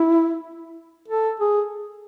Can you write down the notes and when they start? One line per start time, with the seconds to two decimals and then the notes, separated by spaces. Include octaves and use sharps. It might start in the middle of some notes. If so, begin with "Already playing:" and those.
Already playing: E4
1.08 A4
1.40 G#4